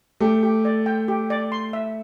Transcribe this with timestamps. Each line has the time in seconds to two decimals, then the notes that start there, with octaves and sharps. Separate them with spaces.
0.20 A3 G4
0.43 G4
0.65 D5
0.86 G5
1.08 G4
1.30 D5
1.52 C6
1.73 E5